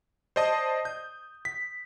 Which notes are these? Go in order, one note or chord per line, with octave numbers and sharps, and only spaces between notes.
C5 D5 D#5 A5 D#6
G6
B6